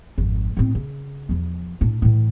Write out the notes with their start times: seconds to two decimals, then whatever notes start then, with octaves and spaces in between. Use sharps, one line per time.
0.18 G#1 F2
0.57 A2 C4
0.75 C#3
1.29 E2 F3
1.81 A2 D4
2.02 A2 E3